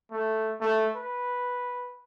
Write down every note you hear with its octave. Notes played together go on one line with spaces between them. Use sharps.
A3
A3
B4